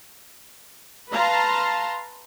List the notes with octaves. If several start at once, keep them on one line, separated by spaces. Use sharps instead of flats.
B4 F5 A5 A#5 C6